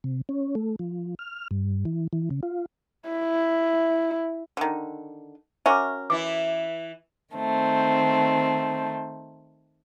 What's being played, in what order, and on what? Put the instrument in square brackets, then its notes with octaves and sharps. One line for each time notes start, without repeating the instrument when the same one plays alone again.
[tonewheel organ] C3
C#4
A3
F3
F6
G2
E3
E3
C#3
F4
[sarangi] E4
[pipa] D3 D#3
[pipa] C#4 F#4 A#4 [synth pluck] E5 C#6 D6
[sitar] E3 E4 [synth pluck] D6 A6
[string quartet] D#3 A3 C4